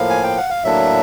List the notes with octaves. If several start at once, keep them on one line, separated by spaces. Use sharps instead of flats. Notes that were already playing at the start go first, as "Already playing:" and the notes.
Already playing: A2 F3 A#3 F5
G#5
G5
F#5
F5
A2 F#3 A#3 D4 E5